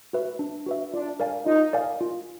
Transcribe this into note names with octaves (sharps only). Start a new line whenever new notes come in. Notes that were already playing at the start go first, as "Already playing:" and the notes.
F#4 B4 E5
D4
F#4 B4 E5
D4 F4
A#4 D5 F5 G#5
D#4 F4
A#4 D5 F5 G#5
F4